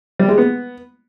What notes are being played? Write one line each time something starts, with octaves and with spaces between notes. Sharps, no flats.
G3
G#3
B3